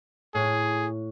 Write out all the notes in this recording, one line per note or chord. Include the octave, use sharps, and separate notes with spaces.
A2 G#4